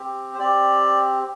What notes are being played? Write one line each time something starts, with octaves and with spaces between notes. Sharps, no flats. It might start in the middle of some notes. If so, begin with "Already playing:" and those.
Already playing: C4 G4
C5
C4 G4 D5